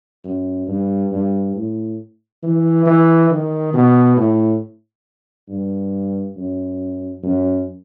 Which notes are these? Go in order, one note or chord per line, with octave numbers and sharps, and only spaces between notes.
F#2
G2
G2
A2
E3
E3
D#3
B2
A2
G2
F#2
F#2